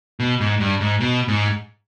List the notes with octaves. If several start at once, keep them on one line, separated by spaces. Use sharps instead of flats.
B2
G#2
G2
G#2
B2
G#2